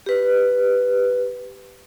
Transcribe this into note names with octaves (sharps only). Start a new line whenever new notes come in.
G4 B4